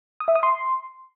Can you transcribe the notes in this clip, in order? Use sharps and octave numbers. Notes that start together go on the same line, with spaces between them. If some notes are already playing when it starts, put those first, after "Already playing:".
D#6
E5
D#6
C6